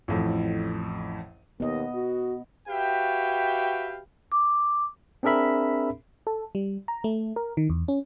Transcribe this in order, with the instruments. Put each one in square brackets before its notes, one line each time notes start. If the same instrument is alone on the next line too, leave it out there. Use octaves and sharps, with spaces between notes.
[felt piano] A1 F2 A2
[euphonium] D#2 [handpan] B3 D#5
[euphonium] F#4
[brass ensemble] F#4 G4 B4 E5 F5 G5
[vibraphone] D6
[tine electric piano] C4 D4 G#4 A#4 E5 B5
[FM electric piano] A4
G3
A#5
A3
A#4
D#3
E2
C#4